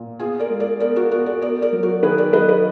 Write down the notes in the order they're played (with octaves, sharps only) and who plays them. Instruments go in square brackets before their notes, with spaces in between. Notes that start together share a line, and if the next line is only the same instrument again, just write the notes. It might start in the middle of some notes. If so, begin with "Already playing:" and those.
Already playing: [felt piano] A#2
B3 F4 G#4
A#4 D5
G#3
A#4 D5
B3 A#4 D5
F#4 A#4
B3 F#4 A#4
A#4 D5
B3 A#4 D5
A#4 D5
F#3
F#4 A#4
D#3 G#4 B4
A#4 D5
F#3 B4 D#5
B4 D#5